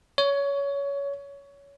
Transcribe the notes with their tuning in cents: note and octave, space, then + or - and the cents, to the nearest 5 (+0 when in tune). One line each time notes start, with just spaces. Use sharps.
C#5 +20